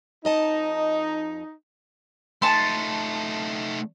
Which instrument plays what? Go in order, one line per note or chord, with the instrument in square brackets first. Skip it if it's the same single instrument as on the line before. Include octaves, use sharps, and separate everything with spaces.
[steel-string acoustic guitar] F2 D#5 A5 [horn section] D#4
[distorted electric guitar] A3 D#4 [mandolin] A5 C6